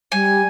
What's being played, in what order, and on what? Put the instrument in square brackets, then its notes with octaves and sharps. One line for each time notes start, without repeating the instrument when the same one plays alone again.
[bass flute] G3 [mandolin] G#5